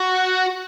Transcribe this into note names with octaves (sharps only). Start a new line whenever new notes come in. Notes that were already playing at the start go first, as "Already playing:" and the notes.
Already playing: F#4